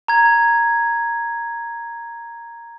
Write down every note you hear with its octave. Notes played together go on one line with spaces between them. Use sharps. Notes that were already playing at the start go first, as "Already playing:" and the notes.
A#5 G#6